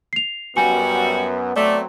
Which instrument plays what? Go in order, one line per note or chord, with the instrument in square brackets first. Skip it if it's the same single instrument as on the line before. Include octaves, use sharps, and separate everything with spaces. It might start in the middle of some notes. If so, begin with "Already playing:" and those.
[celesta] C7 F7
[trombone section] F#2 [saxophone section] G3 F#4 [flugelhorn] B3 [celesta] G#5
[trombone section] F#3 B3 C4 [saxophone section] A3 [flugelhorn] D5